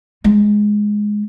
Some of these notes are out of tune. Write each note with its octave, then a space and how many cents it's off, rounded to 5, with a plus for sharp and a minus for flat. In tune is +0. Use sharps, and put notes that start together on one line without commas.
G#3 +0 F4 +15